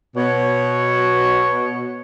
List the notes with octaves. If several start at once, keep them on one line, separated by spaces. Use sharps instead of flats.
B2 C#5